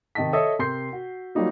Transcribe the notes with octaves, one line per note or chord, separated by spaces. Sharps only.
C3 D#3 D#5 A5 B6
A4 C#5 D#5 E5 D#6
C3 A#4 C6 G6 C7
F#4
F#3 G3 A#3 D#4 F4